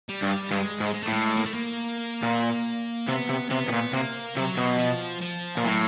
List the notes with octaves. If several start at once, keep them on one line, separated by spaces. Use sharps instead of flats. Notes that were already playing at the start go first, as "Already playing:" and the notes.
G3
G2
G2 G#3
G#2
G#3
A3
A2
G#3
A#3
A3
A#3
A#2
C3 B3
C3
C3 B3
B2
A#2
C3 A#3
C3 F#3
B2
F3
F3
A#2
A2 F#3